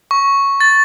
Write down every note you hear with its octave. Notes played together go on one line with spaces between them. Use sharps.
C#6
A6